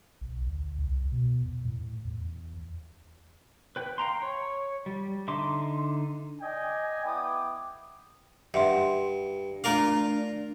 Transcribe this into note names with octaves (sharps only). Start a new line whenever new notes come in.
B1
D2
C2
B2
E2
A2
E2
B4 G5
F5 G5 A#5 C6
C#5
G3
D3 D#4 E5 C6 D6
D5 D#5 G5 G#5
B3 E4 G5 D6 D#6
G2 E5 F#5 C6
A3 D4 F4 A#4 F5 A#5 D6